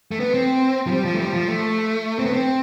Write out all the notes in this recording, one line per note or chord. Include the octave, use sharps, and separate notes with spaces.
A3
B3
C4
F3
G3
F3
A3
G3
F3
A3
C4
B3
C4